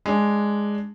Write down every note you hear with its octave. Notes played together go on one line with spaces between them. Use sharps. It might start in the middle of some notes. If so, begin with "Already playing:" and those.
G#3 D4